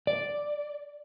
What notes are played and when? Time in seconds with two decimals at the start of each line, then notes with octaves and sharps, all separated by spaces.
0.07 D5